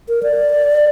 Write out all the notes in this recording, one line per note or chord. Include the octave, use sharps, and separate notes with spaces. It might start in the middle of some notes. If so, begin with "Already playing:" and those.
A#4
D5